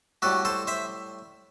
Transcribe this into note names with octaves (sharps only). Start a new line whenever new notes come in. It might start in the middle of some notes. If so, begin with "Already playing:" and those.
A2 G3 F#4 A4
A4 C5
C5 E5